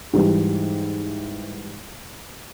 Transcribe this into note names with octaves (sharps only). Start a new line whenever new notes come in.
G#2 E3 G3